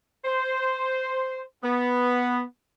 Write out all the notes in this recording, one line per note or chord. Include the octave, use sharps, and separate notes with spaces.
C5
B3